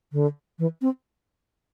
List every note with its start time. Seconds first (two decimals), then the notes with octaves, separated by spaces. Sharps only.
0.13 D3
0.59 E3
0.82 C4